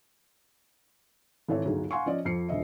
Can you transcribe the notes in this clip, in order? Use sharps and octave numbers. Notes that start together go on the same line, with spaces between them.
G#1 E3 A4 C#5
G1 D2 F#3 D#4 G#4
F5 F#5 G#5 C6 C#6
F3 C#4 D5 D#5
F2 F3 C7 C#7
D#1 D2 F3 D#5 E5